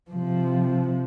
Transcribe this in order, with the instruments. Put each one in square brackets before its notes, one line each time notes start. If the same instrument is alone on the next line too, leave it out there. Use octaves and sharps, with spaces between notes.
[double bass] C3 F3